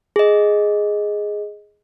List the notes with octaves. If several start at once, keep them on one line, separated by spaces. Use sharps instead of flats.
G#4 D#5